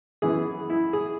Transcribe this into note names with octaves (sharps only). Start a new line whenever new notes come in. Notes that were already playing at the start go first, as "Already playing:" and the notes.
F#2 E3 B3 G#4
E4
G#4